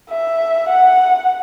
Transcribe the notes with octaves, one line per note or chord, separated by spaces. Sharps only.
E5
F#5